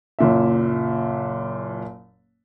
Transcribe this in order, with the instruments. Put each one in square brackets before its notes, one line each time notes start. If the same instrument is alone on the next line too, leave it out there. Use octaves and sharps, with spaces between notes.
[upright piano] F#1 A#2 E5